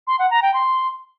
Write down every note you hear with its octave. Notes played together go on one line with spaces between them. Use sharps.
C6
F#5
A#5
G5
C6